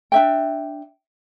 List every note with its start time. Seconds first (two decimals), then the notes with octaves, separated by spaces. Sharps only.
0.12 D4 E5 G5